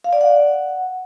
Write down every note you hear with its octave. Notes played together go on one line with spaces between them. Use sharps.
F5
D5
F#5